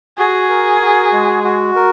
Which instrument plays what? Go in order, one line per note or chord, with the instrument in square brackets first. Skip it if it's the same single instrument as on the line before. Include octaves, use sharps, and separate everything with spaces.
[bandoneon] F#4 [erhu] G#4
[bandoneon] A#4
F#4
G#3
F#4
A#4